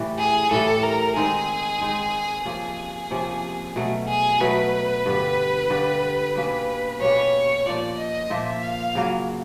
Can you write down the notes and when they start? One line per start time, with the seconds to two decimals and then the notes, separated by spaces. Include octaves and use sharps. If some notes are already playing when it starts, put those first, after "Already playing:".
Already playing: A2 E3 G3
0.18 G#4
0.51 A2 E3 G3 A4
0.83 A#4
1.16 D#3 G#3 C4 D#4 G#4
1.81 D#3 G#3 C4 D#4
2.45 C3 F3 A#3 C#4 G#4
3.11 C3 F3 A#3 C#4
3.76 B2 F#3 A3
4.08 G#4
4.40 B2 F#3 A3 B4
5.06 G2 D3 G3
5.70 G2 D3 G3
6.35 B2 G3 A#3 C#4
7.00 B2 G3 A#3 C#4 C#5
7.66 A#2 F3 A#3 D5
7.98 D#5
8.30 A#2 F3 A#3 E5
8.62 F5
8.95 C#3 F#3 A#3